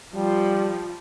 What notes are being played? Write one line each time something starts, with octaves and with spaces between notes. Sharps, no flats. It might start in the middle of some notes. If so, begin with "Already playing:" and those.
F3 G3